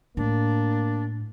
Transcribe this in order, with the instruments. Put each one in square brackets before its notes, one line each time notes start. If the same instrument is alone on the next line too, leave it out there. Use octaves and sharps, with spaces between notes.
[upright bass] A2 [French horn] A#3 [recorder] D4